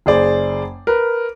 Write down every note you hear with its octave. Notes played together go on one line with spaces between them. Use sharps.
F#1 G#4 C5 D5
A#4 B4